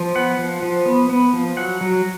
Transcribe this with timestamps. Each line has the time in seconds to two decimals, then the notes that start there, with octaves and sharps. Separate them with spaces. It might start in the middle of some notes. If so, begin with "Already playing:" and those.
Already playing: F3
0.15 B3 F#5
0.39 F3
0.62 F3
0.86 B3
1.09 B3
1.33 F3
1.57 F#3 F#5
1.81 F#3